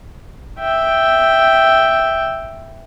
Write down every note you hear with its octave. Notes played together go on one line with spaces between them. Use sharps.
E5 G5